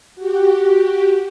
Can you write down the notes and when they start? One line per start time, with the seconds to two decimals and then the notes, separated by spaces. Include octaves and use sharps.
0.16 F#4 G4